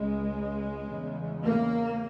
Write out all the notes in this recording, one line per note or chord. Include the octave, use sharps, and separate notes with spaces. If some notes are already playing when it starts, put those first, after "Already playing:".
Already playing: C#2 C#3 G#3
E2 C#3
A#3